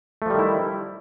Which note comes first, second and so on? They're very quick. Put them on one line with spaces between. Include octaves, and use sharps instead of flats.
A3 F3 G3 D#3 E4